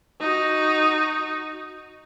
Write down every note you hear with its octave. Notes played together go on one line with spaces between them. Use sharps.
D#4 F#4